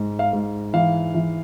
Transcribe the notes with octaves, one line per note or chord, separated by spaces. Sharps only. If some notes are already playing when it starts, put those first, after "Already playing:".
Already playing: G#2
F5
G#2
E3 F5
E3